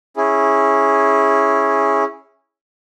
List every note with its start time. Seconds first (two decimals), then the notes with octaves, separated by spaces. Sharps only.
0.17 C#4 E4 G#4